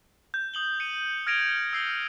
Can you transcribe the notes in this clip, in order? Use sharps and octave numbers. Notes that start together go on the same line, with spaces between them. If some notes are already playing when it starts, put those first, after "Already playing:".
G6
D#6 F#7 G7
C#7 D#7
F6 G#6 A#6 D7 D#7 F7
E6 C7 G7